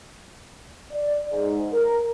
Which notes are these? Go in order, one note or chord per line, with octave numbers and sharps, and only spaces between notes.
D5
G#2
A#4